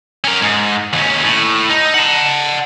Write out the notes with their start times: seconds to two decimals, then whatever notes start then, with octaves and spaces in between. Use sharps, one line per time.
0.24 C#4 A#4
0.42 G#2
0.93 D#2 C#4
1.24 A2
1.70 D#4
1.94 F#5 A5